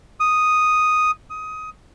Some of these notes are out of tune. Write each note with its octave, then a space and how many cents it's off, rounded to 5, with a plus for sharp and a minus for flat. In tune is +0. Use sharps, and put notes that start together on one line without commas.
D#6 +0
D#6 +15